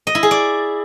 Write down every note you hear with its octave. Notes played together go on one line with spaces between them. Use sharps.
D#5
E4
G#4
D5